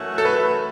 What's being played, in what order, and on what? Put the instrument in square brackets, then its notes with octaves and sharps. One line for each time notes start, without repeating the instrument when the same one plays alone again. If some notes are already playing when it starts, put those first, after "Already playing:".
Already playing: [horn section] F#2 E3 A3 C#4 F#4
[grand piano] A4
B4